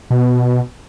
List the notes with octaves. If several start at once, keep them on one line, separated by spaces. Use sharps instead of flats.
B2